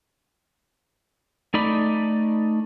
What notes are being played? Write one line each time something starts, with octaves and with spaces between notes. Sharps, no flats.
A3 D#4 D5 B5